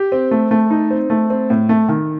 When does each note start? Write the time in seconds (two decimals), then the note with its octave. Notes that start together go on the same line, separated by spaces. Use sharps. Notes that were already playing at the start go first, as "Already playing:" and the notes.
Already playing: G4
0.12 C4
0.31 A3
0.51 A3
0.70 D#4
0.91 C4
1.10 A3
1.30 C4
1.50 A2
1.69 A3
1.89 D#3